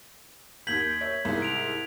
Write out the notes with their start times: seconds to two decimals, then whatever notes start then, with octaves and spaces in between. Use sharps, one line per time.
0.67 D#2 G6 G#6 B6 F#7
1.01 C#5 E5
1.25 C2 G#2
1.42 D7 F7